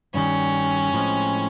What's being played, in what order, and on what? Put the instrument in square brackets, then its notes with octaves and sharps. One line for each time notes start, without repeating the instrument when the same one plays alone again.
[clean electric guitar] G2 D#3 G3 [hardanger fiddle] C#4
[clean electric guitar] A2 F3 G#3 C4